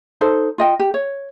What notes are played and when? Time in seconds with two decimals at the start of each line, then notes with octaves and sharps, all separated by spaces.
0.21 D#4 A4 C5
0.58 F4 D#5 G5
0.79 G4
0.94 C#5